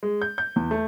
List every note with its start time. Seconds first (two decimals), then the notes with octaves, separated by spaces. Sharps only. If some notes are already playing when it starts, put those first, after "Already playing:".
0.03 G#3
0.22 G6
0.38 G6
0.56 E2
0.71 A3